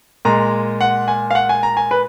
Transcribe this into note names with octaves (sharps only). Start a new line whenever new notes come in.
A#2 G#3 A#5
F#5
G#5
F5
F#5
G#5
A#5
G#5
B4